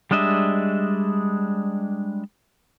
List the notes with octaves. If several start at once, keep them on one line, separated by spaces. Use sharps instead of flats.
G3 G#3 D4 D#5 E5